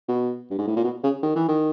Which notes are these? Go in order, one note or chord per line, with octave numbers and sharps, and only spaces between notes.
B2
G2
G#2
A2
A#2
B2
C#3
D#3
E3
D#3